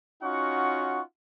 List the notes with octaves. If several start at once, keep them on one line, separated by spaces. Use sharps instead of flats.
C#4 D#4 F4 F#4 F#5 C#6